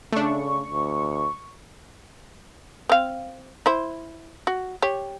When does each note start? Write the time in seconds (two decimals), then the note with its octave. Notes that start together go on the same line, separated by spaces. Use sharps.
0.13 C#3 A3 D4 C#6
0.71 D2
2.89 C4 F5
3.66 E4 C5
4.47 F#4
4.82 G4 C#5